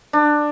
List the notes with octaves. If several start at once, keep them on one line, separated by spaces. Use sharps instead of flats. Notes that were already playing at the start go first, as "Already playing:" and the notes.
D4